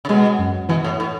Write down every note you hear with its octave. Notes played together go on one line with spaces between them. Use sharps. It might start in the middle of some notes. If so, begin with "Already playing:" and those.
C#3
B2 G#3
F#2
B2 E3
A2
A2